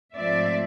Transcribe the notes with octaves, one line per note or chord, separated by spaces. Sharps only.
G#2 F3 A3 C4 D5 E5